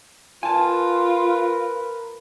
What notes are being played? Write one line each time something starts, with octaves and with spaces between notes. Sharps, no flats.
F4 A#4 B4 G#5 A5